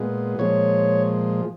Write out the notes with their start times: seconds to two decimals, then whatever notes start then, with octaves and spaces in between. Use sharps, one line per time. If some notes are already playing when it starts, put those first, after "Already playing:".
Already playing: A#2 G#3 B3
0.39 A#2 F3 G#3 C#5